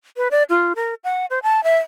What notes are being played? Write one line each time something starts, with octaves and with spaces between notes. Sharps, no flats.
B4
D5
F4
A#4
F#5
C5
A5
E5